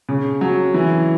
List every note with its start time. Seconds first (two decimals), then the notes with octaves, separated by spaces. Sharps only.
0.09 C#3
0.41 F#3
0.74 E3